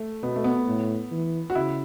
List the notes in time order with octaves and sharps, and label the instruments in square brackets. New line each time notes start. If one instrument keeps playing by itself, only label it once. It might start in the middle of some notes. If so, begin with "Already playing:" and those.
Already playing: [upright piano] A3
[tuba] B2 [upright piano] B3
[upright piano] A3
B3
[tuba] A2
E3
[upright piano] F#4
[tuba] C#3 [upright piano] E4